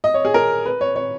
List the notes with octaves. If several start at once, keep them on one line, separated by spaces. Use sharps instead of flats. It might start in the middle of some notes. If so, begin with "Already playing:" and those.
D#5
C#5
G#4
A#4
B4
C#5
C#5